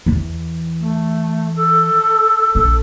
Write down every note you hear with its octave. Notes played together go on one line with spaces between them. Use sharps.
E2 E3
A3
A4
A#1 A4